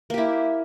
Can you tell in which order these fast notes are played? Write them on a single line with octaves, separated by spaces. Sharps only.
A#3 G4 E4